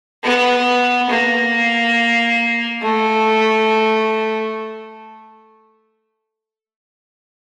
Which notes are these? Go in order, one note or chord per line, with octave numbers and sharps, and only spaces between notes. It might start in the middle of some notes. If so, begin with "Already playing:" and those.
B3
A#3
A3